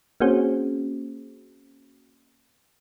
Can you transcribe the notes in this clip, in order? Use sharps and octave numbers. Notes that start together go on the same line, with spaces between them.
A#3 C4 C#4 F#4 G#4 C5